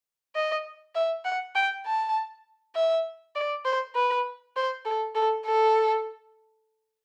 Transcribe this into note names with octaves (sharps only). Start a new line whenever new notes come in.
D#5
E5
F#5
G5
A5
E5
D5
C5
B4
C5
A4
A4
A4